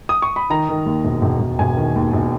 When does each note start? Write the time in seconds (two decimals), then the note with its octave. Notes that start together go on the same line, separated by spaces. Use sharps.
0.09 D#6
0.22 C#6
0.36 B5
0.50 D#3 A#5
0.69 D#3
0.86 D#2
1.05 E1
1.22 E1
1.40 E1
1.59 E1 G#5
1.77 D#3
1.96 D#2
2.13 E1